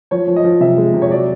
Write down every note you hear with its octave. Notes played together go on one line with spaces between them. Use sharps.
F3 C#5
F3
D#5
F3
C3 E5
G#3
C3
C#5
F#3 D5